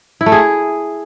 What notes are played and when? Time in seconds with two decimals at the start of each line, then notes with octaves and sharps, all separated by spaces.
0.21 E4
0.26 A3
0.32 G#4